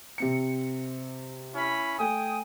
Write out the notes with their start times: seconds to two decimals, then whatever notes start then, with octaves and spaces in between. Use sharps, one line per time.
0.18 C3 C4 C#7
1.55 C#4 E4 B5
1.98 A3 G5 G#5 D#6